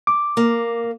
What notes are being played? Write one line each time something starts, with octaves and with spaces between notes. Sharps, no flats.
D6
A#3